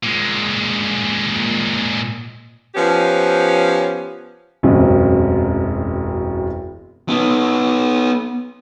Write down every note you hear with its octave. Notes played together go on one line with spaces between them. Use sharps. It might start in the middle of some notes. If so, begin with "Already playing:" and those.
A#2 G#3
F3 B3 C#4 G4
E1 A1 F#2 C4
B3 D#4